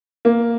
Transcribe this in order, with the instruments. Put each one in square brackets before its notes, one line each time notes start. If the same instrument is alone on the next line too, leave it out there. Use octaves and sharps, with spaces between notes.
[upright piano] A#3